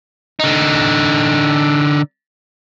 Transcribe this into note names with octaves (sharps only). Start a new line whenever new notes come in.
D3 D#4